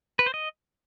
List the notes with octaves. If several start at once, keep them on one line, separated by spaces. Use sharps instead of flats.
B4
C5
D#5